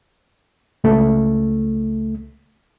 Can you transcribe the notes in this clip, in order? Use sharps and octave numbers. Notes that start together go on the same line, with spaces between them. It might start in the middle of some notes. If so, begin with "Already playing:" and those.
C#2 A3